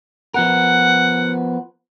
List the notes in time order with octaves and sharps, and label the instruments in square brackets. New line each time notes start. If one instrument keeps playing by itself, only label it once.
[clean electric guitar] F3 B3 A#4 [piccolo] F#5